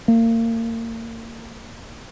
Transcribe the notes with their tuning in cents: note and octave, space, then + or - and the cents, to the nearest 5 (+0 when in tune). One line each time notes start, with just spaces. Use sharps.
A#3 -35